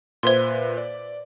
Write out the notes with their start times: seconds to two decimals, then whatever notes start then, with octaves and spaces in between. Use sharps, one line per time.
0.23 A#2 B4 C5 E5 C6
0.77 D5